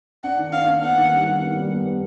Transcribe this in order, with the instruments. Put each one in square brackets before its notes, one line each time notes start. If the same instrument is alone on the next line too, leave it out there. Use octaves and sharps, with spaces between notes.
[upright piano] D4 [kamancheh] F#5
[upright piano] D#3
[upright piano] D4 [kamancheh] F5
[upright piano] D4
[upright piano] B3 [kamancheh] F#5
[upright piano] D#3
G3
D#3
B3
G3
B3
B3